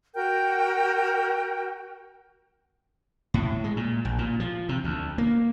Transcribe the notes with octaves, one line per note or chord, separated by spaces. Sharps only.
F#4 A#4 G5 G6
A2
G#3
A#2
A#1
A#2
F3
C3
D2
A#3